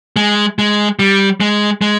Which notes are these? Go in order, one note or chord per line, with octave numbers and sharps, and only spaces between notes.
G#3
G#3
G3
G#3
G#3